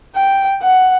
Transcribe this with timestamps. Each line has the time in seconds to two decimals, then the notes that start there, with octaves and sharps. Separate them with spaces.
0.15 G5
0.62 F#5